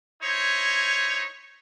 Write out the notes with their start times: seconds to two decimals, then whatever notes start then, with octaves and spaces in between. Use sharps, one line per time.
0.21 D#4 E4 C5 C#5